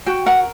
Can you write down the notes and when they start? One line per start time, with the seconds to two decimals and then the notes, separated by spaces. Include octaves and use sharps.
0.06 F#4 G5
0.26 A#4 F#5